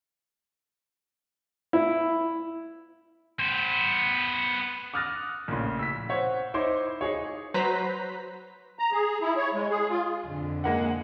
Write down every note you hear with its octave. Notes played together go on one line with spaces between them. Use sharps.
E4
B3 C5
D6 D#6 F6 F#6 A6 A#6
A#1 A2 C#3 C6
E6 B6
C5 C#5 F#5
D#4 E4 C5 C#5 C6 D6
D#4 G#4 C#5
F#3 B4 C5 A#5 B6
A#5
G#4
E4
C#5
G#3
G#4
F4
F2 D3
G#3 A#3 F#5